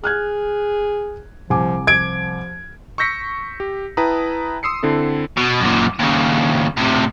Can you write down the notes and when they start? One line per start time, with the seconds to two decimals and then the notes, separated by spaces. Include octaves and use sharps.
0.04 G#4 F6 F#6 G#6
1.50 C2 F3 G#5 D6
1.87 F3 G#6 D7
2.98 C#6 E6 G6 A#6 B6 C#7
3.60 G4
3.97 E4 B4 G5 A5 A#5 D#6
4.63 C6 D#6 E6 C7 C#7
4.83 D3 C4 E4 A4
5.37 B2
5.61 F#2 A#2
5.99 D#2 C#3
6.77 A2 C3